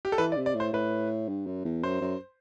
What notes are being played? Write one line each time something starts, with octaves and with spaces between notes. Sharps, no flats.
G4
A4
E3 B4
D5
C3
D5
A2
C5
A2 B4
G2
F#2
E2
F#2 C5
F#2